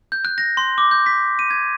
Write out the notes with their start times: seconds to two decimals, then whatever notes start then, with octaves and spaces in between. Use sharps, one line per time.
0.12 G6
0.25 F#6
0.38 A#6
0.57 C6
0.78 D6
0.91 G6
1.06 B6
1.39 D#7
1.50 G#6